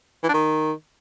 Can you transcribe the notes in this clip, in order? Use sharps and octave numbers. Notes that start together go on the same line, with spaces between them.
E3
D4
D#3